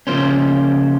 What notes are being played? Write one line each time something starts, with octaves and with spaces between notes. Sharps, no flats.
C#3 F3 A#3 C#4 C5